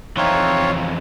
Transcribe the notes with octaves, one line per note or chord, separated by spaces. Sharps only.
F2 E3 C4 D#4 F4 C#5